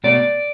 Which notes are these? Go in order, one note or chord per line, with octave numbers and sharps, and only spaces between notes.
B2 A3 D5